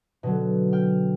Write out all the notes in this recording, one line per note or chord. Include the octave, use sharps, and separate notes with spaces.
B2 D3 F#3
G5 F6